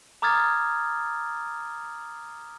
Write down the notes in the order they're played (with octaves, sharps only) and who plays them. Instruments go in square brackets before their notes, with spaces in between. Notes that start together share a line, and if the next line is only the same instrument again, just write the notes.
[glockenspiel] A#5 D6 D#6 F6 G#6 A6